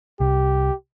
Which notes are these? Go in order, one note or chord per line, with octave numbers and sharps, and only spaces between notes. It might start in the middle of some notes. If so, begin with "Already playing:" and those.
C2 G4